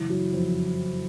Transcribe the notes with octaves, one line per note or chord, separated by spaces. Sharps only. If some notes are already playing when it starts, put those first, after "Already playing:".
Already playing: F#1 E3 E4
F#3
F2